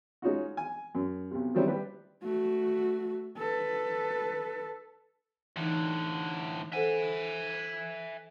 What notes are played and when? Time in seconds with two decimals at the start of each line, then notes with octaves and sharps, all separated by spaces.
0.22 G#3 C#4 D#4 F4 F#4
0.57 G#5
0.95 F#2
1.31 B1 C3
1.55 D#3 F#3 G3 C4 C#4 E4
1.68 G3 G4 B4
2.23 A3 F#4
3.37 A4 B4
5.56 A2 D3 E3 D#4
6.72 A4 C5 E5 F#5 G#5